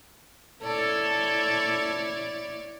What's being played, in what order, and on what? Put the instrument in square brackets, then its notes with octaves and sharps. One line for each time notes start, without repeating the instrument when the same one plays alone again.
[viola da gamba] E4 C#5 D5 [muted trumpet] A4